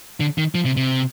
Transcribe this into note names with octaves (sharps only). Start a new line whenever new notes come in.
D3
D#3
F3
C3
C3